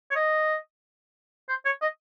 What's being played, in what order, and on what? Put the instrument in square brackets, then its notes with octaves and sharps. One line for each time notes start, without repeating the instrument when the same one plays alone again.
[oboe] C#5
D#5
C5
C#5
D#5